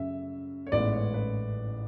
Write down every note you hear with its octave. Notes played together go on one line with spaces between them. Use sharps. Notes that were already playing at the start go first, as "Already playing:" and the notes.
Already playing: F#2 C#3 E5
C#5
A1 G#2 E3 G#3 B3 D5
C#5
B4